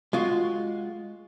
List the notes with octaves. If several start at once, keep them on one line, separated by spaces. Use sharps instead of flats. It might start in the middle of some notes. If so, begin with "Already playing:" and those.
G#3 F4 F#4